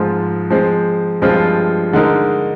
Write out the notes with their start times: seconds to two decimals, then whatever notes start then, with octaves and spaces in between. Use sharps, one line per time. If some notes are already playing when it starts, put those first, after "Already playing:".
Already playing: G#2 F3 G#3 C4 F4
0.51 F3 G#3 C4
1.21 G2 F3 G#3 C4 F4
1.93 D3 G#3 D#4 A#4